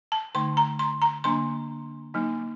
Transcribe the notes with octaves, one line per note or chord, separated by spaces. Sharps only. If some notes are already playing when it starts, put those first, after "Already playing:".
A5
D3 A3 D#4 C6
A#5
C6
A#5
D3 F#3 A#3 D4 C6
F#3 A#3 D#4